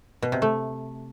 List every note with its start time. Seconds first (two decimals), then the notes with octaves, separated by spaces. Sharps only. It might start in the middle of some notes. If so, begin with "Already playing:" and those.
0.22 B2
0.32 C3
0.42 A3